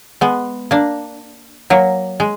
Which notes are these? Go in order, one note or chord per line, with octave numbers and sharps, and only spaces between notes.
G#3 B3
A#3 D4
F#3 A#3
G#3